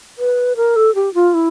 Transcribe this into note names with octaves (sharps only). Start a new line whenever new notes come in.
B4
A#4
A4
G4
F4
E4